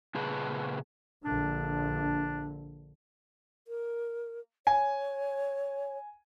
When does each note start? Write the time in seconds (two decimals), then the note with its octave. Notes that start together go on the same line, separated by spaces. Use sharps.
0.15 A#2 C#3 G#4 B4 A5
1.24 A#1 D3 D4
3.68 A#4
4.67 C#5 G#5